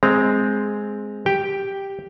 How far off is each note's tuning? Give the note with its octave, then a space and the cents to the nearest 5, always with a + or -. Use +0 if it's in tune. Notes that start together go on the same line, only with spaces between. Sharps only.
G#3 +0 C4 +0 A#5 +0
G4 +0 G5 +0